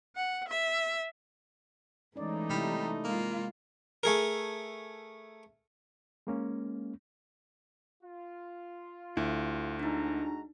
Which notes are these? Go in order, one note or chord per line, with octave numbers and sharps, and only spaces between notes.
F#5
E5
E3 G#3 A3 C#4 D#4 D5
C3 G3 E4
G#3 A#3 F4
A3 G#4 A#4
G#3 A#3 C#4
F4
D2 E4
G#3 D4 D#4 F#4 A#5